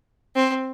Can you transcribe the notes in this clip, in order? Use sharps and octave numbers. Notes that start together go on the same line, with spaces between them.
C4